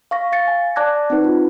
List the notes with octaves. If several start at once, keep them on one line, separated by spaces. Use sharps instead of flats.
F5 C#6 A#6
F5 A6 C#7
G#5
D5 A5 D6 F#6 G#6 A#6
C4 D#4 B4
F4